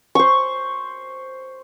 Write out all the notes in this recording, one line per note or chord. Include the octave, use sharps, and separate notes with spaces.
C5 C#6